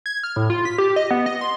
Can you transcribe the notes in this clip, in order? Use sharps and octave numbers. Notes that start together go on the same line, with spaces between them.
G#6
F6
A2
F4
B6
G4
D#5
B3
D#5
C6